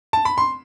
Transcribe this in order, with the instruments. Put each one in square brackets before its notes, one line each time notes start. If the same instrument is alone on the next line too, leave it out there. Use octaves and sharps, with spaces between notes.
[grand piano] A5
B5
C6